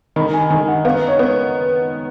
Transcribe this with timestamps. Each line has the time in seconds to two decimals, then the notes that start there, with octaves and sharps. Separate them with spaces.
0.16 D#3 B5
0.33 G#5
0.50 D#3 G#5
0.68 F#5
0.85 B3 F5
1.08 C#5
1.19 B3